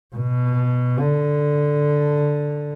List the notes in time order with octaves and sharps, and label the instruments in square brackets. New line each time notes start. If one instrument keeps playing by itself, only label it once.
[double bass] B2
D3